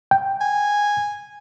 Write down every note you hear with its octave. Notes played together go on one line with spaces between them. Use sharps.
G5
G#5